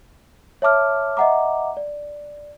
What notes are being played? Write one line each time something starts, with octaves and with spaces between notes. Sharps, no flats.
C#5 E5 A5 D6 F6
D#5 E5 F#5 A#5 D6
D5